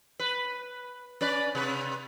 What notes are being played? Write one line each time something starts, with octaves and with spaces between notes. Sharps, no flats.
B4
C#4 B4 D5
C3 B4